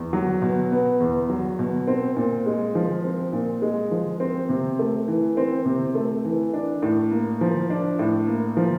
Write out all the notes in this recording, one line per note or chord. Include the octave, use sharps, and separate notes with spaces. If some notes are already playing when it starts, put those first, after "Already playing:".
Already playing: E2
F#3
B2
B3
E2
F#3
B2
C4
A#2
G#3
F3
C4
A#2
G#3
F3
C4
C3
A3
E3
C4
C3
A3
E3
D4
A2
A#3
F3
D4
A2
A#3
F3